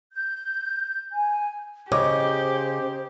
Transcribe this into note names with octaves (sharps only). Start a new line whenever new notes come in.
G6
G#5
C#3 G4 C5 C#5 D#5 D6